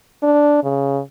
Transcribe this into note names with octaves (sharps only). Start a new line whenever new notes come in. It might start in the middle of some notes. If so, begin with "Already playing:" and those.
D4
C#3